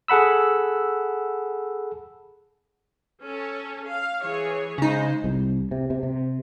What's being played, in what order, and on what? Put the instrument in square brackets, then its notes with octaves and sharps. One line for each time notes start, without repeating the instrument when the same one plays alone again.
[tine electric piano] G#4 A4 F#5 B5 E6
[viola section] C#4 A4
F5
E3 G#4 C#5
[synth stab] C#3 D#4 [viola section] G#3 C5
[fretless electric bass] C2
C3
C3
C3